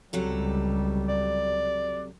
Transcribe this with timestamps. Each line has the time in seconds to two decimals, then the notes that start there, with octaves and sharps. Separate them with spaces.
0.13 C#2 C3 F#3 G3 A4
1.08 D5